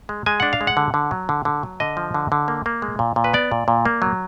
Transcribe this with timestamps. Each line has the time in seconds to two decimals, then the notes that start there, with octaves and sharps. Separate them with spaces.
0.09 G#3
0.26 G#3 G#5
0.40 D4 F#5
0.53 F5
0.61 G#3
0.67 F#5
0.77 D3
0.94 D3
1.11 F#3
1.29 D3
1.45 D3
1.63 F#3
1.80 D3 D#5
1.97 F3
2.14 D3
2.32 D3
2.48 A#3
2.66 A#3
2.82 G#3
2.99 A#2
3.16 A#2
3.24 B4
3.34 B3 D5
3.51 A#2
3.68 A#2
3.85 A#3
4.02 F#3